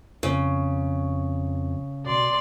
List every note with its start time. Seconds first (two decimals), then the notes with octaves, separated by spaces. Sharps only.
0.23 F2 C#3
2.06 B2 D5 C6